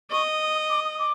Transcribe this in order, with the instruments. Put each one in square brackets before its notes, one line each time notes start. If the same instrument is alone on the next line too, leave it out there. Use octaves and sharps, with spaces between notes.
[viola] D#5 [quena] C#6
[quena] D#6
D6
D#6
D6